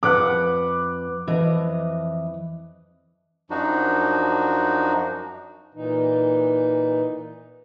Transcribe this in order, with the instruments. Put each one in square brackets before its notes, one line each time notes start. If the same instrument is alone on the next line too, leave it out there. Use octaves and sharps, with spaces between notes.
[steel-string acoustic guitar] F2 B4 F#5 [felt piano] D6 F#6
[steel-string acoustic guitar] F2 E3 D#5
[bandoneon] F#2 F3 D4 D#4 F#4
[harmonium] A#2 E3 D#4